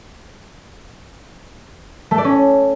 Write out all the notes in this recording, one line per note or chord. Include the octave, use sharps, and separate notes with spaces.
A3
D5
C#4